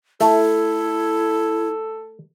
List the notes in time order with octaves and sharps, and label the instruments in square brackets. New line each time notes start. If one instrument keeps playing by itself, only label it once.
[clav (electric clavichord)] A3 [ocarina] E4 [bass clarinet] A4